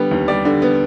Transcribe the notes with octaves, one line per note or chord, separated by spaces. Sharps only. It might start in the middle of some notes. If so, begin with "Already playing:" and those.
Already playing: D3 G3 B3
D#2
G3 D5
D3
B3